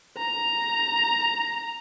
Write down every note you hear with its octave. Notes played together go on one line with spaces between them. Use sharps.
A#5